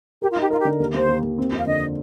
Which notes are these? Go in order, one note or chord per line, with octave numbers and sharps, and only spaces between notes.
G4 A#4
F4
D#4 G4
F4 A#4
G4
D3
D#2 A#4
D#2 C5
D#2
D#2
C4
F2
F5
D3 D#5